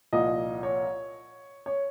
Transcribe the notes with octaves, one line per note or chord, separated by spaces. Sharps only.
C2 A#2 F3 D#5
C#5
C#5